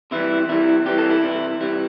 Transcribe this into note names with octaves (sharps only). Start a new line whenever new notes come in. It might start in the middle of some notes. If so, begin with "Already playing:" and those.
C3 E3 G3 E4
C3 E3 G3 E4
C3 E3 G3 G4
A4
E4
C3 E3 G3
C3 E3 G3 E4